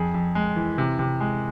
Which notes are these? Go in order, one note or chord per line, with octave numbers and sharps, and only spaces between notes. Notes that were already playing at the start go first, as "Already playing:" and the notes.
Already playing: F2 G#4
F2
G#3
E3
C3
C3
G#3